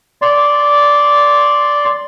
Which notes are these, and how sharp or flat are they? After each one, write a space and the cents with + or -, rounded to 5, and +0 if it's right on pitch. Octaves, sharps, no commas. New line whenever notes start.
D5 -10 C6 +0